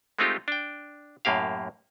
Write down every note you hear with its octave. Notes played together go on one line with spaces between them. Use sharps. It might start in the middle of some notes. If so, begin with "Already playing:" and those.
G#3 A3 C4 D#4 F4 G4
D4 G5
F#2 A2 A#3 G4 F5